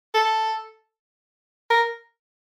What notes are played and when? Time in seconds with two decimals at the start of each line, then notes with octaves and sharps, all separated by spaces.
0.14 A4
1.70 A#4